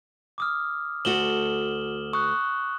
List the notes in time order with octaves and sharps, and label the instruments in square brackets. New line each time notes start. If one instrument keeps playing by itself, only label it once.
[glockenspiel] D6 D#6 F6
[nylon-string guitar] D2 A3 F#4 [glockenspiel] E7 F#7 G7
[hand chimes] C#6 [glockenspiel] D#6 F#6